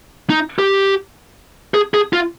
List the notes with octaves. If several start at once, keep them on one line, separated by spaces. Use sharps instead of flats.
D#4
G4
G#4
G#4
F4